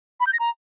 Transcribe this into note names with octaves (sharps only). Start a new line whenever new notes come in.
B5
G6
A#6
A#5